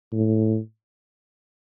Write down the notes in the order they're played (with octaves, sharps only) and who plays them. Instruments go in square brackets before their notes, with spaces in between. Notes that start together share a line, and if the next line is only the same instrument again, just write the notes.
[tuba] A2